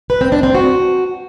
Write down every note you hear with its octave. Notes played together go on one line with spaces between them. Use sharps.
B4
C4
D4
C4
F#4